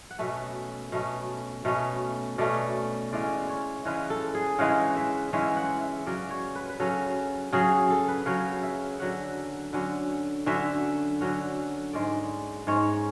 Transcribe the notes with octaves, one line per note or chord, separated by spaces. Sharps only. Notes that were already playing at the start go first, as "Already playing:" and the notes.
F#5
B2 A3 C#4 E5
B2 A3 C#4
B2 A3 C#4
B2 A3 C#4 D5
C#3 E3 G#3 C#4 D5
C#5
C#3 E3 G#3 C#4 B4
A4
G#4
C#3 E3 G#3 C#4 F#5
E5
C#3 E3 G#3 C#4 E5
F#5
E5
C#3 F#3 C#4 D5
C#5
B4
B4
C#3 F#3 C#4 A4
C#3 F#3 C#4 G#4
A4
B4
C#3 F#3 C#4 C#5
E5
D3 F#3 C#4 F#5
D3 F#3 C#4
D3 F#3 C#4 E5
D3 F#3 C#4
G#2 G#3 C#4 D5
G#2 G#3 C#4 C#5